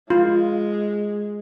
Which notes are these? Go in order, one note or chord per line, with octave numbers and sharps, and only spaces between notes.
G#3 F4